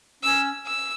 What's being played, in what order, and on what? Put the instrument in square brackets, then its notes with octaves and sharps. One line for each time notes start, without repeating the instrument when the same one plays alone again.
[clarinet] C#4 [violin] E6
[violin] E6